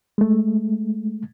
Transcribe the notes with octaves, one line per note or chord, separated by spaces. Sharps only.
G#3 A3